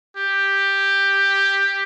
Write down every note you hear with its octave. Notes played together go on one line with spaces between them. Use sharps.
G4